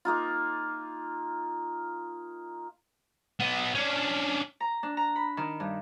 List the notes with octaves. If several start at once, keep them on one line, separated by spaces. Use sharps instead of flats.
A#3 D#4 F4
B3 D#4
C#4 D4
A#5
D4
A#5
B5
D#3
G2